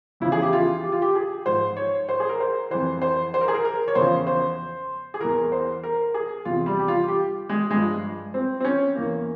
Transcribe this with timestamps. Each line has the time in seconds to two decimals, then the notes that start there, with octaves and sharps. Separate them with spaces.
0.20 E2 C#3 F3 E4
0.32 G#4
0.42 G4
0.53 F4
0.83 G4
0.92 F4
1.02 G4
1.15 G#4
1.46 G#2 F3 C5
1.77 C#5
2.09 C5
2.20 G#4
2.29 A#4
2.40 C5
2.70 F2 E3 C5
3.02 C5
3.34 C5
3.41 A#4
3.48 G#4
3.55 A#4
3.65 A#4
3.88 C#5
3.95 E2 C#3 F3 C5
4.27 C5
5.14 G#4
5.20 E2 E3 A#4
5.52 C5
5.83 A#4
6.14 G#4
6.45 E2 C3 F3 F4
6.66 G3
6.79 G4
6.88 F4
7.08 G4
7.49 G#3
7.70 G2 F3 G#3
8.34 C4
8.60 C4
8.65 C#4
8.96 E2 E3 A#3